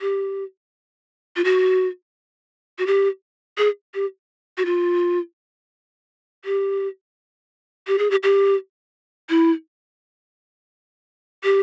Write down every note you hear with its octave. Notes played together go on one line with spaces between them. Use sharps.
G4
F4
F#4
F#4
G4
G#4
G4
F#4
F4
G4
G4
G#4
G4
G4
E4
G4